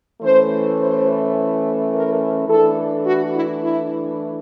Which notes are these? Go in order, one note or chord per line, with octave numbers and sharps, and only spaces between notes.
E3 A3 C#4 C5
C5
A#4
E3 A3 D4 A4
F#4
E4
E4